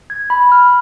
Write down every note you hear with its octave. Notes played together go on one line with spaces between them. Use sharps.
G#6
B5
F6